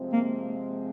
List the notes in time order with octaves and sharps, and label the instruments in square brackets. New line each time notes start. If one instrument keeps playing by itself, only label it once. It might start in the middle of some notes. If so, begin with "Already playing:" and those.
Already playing: [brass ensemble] C3 F3 G#3 C4
[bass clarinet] A#3